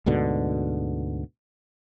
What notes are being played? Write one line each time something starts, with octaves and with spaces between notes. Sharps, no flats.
D2 G#2 B2 D3